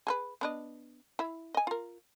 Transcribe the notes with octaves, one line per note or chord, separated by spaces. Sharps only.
G#4 A4 B4
B3 D4 D#5
E4 E5
D#5 G#5
F4 A#4